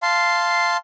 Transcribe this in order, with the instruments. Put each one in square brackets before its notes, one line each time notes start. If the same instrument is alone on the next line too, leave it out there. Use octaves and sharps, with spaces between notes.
[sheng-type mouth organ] F5 A5 C6